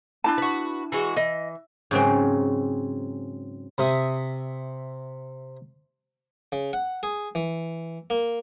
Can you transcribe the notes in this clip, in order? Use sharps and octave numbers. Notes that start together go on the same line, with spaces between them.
D4 E4 A5
F#4 B4
E3 G#3 F#4
E3 D#5
G#2 C#3 F#3 C4
C3 E5 D#6
C#3
F#5
G#4
E3
A#3